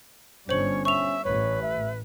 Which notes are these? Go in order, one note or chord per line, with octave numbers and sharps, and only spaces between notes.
G1 G2 C#4 C5 C#5 F#7
E5 C#6 F7
A1 B4 C#5
E5